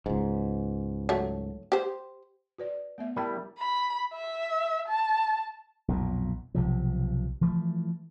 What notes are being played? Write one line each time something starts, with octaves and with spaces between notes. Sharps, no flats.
C#2 G#2
F#3 A3
G4 C5
F#4 B4 D5
A3 B3 E5
G3 E4 A#4 G5 A5
B5
E5
A5
B1 F2 A#2
B1 C3 F3
E3 F3 A3